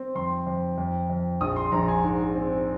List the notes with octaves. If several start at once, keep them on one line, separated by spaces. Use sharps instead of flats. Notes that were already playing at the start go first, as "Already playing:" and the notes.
Already playing: C4
F2 C6
F2
F2
F2
A#1 D#6
C6
A#1 A#5
G#5
G#2
C4